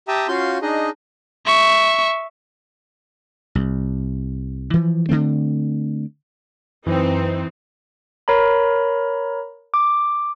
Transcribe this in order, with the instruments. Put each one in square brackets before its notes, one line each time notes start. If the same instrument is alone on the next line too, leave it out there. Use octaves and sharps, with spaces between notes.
[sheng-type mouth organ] G4 E5 G5 A5 A#5 D#6
C#4 F4 F#4 F5 C6 G6
D4 D#4 G#4 D#5
[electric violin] E5 C#6
[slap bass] C2
E3 F3
D3 D#3 A3 C4
[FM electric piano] F#2 [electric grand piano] E3 [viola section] C4 D#4 [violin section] B4 C5
[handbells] A#4 C#5 A#5 B5
D6